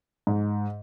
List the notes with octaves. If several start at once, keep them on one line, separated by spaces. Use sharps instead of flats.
G#2